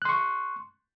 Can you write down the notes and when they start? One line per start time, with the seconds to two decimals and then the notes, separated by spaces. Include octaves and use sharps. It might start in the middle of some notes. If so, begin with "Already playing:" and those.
0.02 F#6
0.05 C6
0.09 C#6